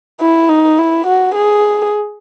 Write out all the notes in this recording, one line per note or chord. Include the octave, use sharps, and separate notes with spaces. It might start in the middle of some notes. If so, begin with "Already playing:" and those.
E4
D#4
E4
F#4
G#4